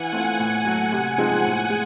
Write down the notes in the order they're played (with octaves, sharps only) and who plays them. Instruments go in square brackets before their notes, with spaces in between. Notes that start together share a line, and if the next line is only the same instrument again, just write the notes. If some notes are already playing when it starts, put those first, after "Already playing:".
Already playing: [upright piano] E3 [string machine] F#5 G#5
[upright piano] A3 C4 F4
A2
F#3 A3
C3
F3 G#3 C4 D#4
A2
G#3